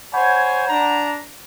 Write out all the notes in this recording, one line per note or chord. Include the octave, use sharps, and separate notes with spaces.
C5 C#5 F#5 G#5 B5 G6
D4 A#5